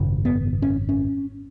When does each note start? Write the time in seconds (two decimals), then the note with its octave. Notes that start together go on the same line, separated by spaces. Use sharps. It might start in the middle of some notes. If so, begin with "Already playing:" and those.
Already playing: G#1 F#2 C#3
0.25 B3
0.62 C#4
0.89 C#4